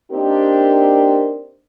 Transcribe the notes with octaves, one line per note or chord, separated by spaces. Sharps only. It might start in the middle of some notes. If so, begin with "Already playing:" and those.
A#3 C4 D4 D#4 G4 A#4